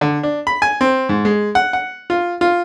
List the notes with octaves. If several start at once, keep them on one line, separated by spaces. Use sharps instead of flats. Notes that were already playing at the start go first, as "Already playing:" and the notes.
D3
D4
B5
G#5
C4
G#2
G#3
F#5
F#5
F4
F4